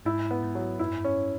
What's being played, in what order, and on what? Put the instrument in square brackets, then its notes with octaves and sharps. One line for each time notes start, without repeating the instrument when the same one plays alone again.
[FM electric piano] G#2 [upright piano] E4
[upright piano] B3
[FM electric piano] G#2
[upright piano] F#3
[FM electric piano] F#2 [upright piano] E4
[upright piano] C#4